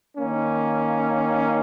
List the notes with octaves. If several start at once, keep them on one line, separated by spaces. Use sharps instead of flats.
D#3 A#3 C#4